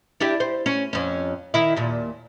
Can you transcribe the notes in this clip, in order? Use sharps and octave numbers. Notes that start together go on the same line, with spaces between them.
D4 E4 G4
C5
C#4
F2 C#4
D#3 E4
D#2 A#2